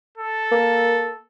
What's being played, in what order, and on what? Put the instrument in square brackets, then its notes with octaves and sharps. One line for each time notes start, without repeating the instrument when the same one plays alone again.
[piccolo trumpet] A4
[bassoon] A#3